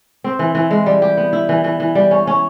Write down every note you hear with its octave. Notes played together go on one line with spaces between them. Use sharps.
C4
E3
E3
G#3
G3
G4
B3
E4
E3
E3
E3
G3
C#4
C#4